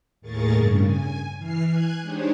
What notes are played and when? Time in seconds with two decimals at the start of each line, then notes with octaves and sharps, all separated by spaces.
0.21 D#2 A2 G#4 A#4 C#6 A6
0.52 G2 C#3
0.83 G#5
1.38 E3 F6 C7
1.68 G#5 F#6 G#6
2.02 G#3 D4 D#4 G4 C5 C#5